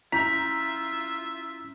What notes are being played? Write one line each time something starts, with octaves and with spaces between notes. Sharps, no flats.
C#4 E4 F4 E5 A#5 G6 B6